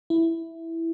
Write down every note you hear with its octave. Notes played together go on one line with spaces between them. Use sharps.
E4